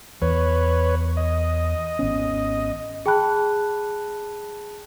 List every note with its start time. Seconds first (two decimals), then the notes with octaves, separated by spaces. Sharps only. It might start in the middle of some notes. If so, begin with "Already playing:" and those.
0.22 E2 B4 C#5
1.17 D#5
1.99 G#1 B3 C#4
3.06 G#4 G5 A5 B5 F#6